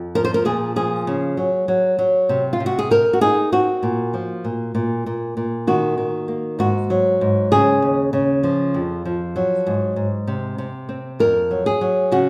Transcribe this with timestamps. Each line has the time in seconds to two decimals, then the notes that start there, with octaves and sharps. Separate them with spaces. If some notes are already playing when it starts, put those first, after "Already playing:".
Already playing: F2
0.15 F3 A#4
0.25 C5
0.34 A#4
0.45 A#2 G#4
0.76 F3 G#4
1.07 C#3
1.37 F#3
1.68 F#3
1.99 F#3
2.29 C3
2.53 F4
2.60 C3
2.66 F#4
2.79 G#4
2.91 C4 A#4
3.13 F#4
3.21 D#4 G#4
3.52 C4 F#4
3.83 A#2
4.14 F3
4.45 A#2
4.75 A#2
5.06 A#2
5.37 A#2
5.67 D#3 F#4
5.98 D#3
6.28 A#3
6.59 G#2 F#4
6.90 F#3
7.21 G#2
7.52 C#3 G#4
7.82 D#2
8.13 C#3
8.43 F3
8.74 F2
9.05 F3
9.36 F#3
9.67 G#2
9.96 G#2
10.27 C3
10.58 C3
10.89 C4
11.19 F2 A#4
11.51 F#3
11.66 G#4
11.81 F#3
12.12 C#3 F#4